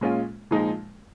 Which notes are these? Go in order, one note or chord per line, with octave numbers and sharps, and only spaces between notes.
A#2 G#3 C#4 F4
A#2 F3 G#3 D#4